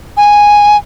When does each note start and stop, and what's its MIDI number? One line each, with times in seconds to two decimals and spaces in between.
0.17 0.77 80